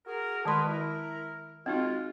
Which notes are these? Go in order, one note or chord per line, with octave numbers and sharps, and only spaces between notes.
F#4 G#4 A#4
D#3 G#3 F#4 B4 C6
E4 A#4
G#3 C4 D#4 F4 F#4